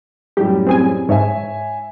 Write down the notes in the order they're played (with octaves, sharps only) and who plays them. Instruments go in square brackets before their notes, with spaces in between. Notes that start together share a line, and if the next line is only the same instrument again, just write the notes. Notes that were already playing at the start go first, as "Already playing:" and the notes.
[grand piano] F#2 A2 G3 [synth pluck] G4
[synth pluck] C4 G#4 G#5
[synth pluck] G#2 [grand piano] C#5 E5 G#5